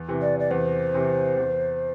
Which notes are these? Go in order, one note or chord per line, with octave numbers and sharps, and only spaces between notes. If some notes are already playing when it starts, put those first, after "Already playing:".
Already playing: E2
C3 E3
D5
D5
E2 C5
C3 E3
E2